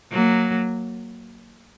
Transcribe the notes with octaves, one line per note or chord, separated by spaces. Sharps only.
F#3 A#3